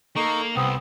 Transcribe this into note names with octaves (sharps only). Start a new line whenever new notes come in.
A#3 D#4 A4 C#6
C2 B3 C4 D#6